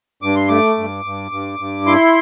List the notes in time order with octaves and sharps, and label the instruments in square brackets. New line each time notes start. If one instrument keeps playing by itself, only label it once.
[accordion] G2 D6
C6
A3 D6
G2
G2
G2
G2
E4 C6